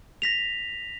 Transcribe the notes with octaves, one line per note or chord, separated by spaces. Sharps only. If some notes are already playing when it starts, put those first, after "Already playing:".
A#6 B6 F7